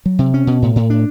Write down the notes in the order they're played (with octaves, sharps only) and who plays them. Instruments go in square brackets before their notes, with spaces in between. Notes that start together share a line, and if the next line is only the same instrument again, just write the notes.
[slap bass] F#3
C3
C#4
B2
A2
A2
D4